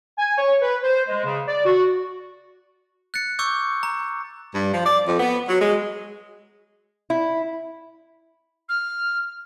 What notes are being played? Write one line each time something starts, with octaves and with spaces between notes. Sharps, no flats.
G#5
C#5
B4
C5
G#3
C#3
D5
F#4
F#6 A6 C#7
C#6 D6 E6 G6
A#5
G2
F3
D5
F2
B3
F#3
G#3
E4
F6